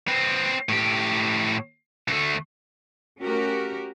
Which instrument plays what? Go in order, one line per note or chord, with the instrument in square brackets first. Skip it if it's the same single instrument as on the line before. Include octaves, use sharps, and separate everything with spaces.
[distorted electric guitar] C4 B4
A2 G4
D2 A3
[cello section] A3 C#4 F#4 G4 A#4